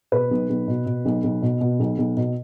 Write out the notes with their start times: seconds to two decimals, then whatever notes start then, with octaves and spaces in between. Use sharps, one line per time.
0.12 B2 B4
0.31 B1
0.50 B1
0.68 B2
0.86 B2
1.05 B1
1.24 B1
1.42 B2
1.61 B2
1.79 B1
1.98 B1
2.17 B2